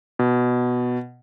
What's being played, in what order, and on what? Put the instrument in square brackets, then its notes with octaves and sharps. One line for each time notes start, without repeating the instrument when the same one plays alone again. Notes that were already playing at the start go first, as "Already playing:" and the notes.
[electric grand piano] B2